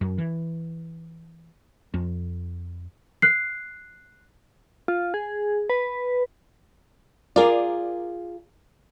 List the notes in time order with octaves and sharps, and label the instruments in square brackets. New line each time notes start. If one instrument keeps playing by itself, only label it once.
[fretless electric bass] F#2
E3
F2
[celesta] F#6 C7
[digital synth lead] F4
G#4
B4
[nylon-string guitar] F4 G#4 [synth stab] A#4 D5